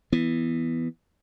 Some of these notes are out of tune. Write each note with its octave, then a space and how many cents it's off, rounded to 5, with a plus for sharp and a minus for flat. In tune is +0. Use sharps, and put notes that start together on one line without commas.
E3 +0 B3 +0